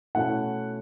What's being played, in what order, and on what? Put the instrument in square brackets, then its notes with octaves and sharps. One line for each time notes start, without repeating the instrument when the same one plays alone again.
[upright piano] B2 A3 C#4 E4 F#5